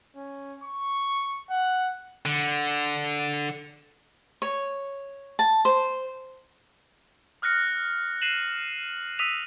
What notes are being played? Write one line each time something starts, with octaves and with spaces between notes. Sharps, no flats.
C#4
C#6
F#5
D3
C#5
A5
C5
D#6 F6 F#6 A#6 C#7
F#6 C7 D#7 E7 F#7
D#6 E6 B6 D#7 F7